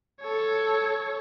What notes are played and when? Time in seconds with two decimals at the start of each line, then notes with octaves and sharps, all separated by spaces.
0.21 A4 C#5